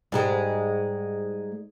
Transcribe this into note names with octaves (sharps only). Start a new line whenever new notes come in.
G#2 G3 G#3